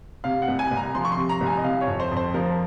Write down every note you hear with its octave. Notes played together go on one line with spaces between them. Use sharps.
C3 F5
F#5
C2
G#5
C2
A#5
F3 C6
C#6
C6
C3
A#5
C2
G#5
D#5
C3 F5
C#5
F2
C5
F2
C5
F3 A#4